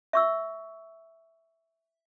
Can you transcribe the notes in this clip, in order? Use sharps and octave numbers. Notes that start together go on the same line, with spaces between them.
E5 C#6 E6